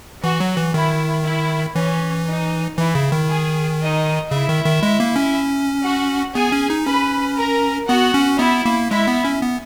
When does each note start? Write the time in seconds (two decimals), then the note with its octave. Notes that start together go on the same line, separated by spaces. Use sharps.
0.23 E3 F#4
0.40 F#3
0.57 E3
0.74 D#3 E4
1.25 E4
1.76 E3 C#4
2.27 D#4
2.78 E3 E4
2.95 C#3
3.12 D#3
3.29 G#4
3.80 D#4 D#5
4.31 C#3 E4 E5
4.49 D#3
4.65 D#3
4.83 G#3
5.00 A#3
5.16 C#4
5.85 F#4 F#5
6.35 B3 G#4 G#5
6.52 C#4
6.70 D#4
6.87 C#4 B4 B5
7.37 A#4 A#5
7.88 B3 F#4 F#5
8.14 C#4
8.39 B3 E4 E5
8.65 A#3
8.90 G#3 E4 E5
9.07 B3
9.25 C#4
9.42 B3